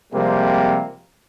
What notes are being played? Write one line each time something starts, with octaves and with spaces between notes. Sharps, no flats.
C3 F3 G3 G#3 A#3 C4